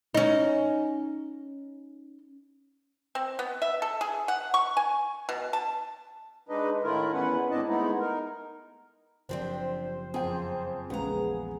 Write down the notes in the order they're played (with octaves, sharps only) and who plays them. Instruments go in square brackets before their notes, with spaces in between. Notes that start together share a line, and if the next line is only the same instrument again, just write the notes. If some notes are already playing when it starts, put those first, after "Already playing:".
[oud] C#4 D#4
[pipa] C4
B3
E5
A4
G#4
F#5
C#6
G#5
B2
A5
[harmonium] G#3 D4 D#4 B4 D#5
A2 D#3 A3 E4 F4 A#4
E2 B3 C#4 E4 B4 F#5
A2 C4 D4 E4 D#5 A5
G#3 A3 B3 D#4 E4
D#4 A#4
[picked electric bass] F#1 F#2 F3 [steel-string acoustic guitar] G3 C4 D4 [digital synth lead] C5
[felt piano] F2 G5 [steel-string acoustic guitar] G#4
[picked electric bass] A#1 E2 [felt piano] C#3 G#3 B3 [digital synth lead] G#4 [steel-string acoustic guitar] F#5 A#5